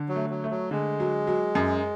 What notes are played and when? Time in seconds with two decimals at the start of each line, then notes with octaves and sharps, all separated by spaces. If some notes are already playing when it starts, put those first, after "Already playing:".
Already playing: D3
0.09 F#3
0.16 A3
0.30 F#3
0.44 A3
0.51 F#3
0.71 D3 G#3
1.00 F#3
1.27 F#3
1.55 F#2